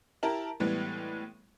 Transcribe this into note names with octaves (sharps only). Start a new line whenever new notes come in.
E4 G4 A#4 A5 A#5
A2 E3 G3 G#3 B3